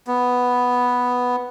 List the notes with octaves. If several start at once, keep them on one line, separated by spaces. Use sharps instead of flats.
B3